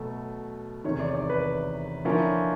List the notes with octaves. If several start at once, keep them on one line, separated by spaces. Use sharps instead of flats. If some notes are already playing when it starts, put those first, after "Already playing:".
Already playing: B2 F#3 A3
E2 C3 D#3 C#5
D5
D5
B4
D3 F3 A#3 C#4 E4